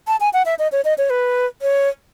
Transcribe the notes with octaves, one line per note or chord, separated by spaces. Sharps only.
A5
G#5
F#5
E5
D#5
C#5
D#5
C#5
B4
C#5